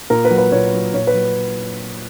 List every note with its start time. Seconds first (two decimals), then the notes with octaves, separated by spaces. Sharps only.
0.10 A#2 A#4
0.25 B4
0.31 F#3
0.38 B4
0.52 A#2 C#5
0.73 F#3
0.94 A#2 C#5
1.07 B4
1.14 F#3